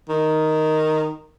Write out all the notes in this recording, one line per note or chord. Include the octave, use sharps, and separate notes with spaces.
D#3